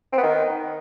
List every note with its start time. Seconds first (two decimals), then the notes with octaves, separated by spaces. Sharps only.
0.12 C4
0.18 B3
0.23 D#3